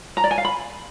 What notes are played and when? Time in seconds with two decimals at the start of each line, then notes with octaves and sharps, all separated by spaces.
0.17 A#5
0.24 D5
0.31 G#5
0.38 F5
0.45 B5